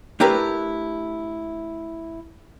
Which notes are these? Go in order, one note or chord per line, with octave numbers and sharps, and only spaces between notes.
A3 D4 E4 G4 A#4 B4